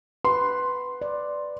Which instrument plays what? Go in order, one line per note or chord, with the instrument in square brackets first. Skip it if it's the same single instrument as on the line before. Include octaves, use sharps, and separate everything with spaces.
[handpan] B4 [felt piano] C6
[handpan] D5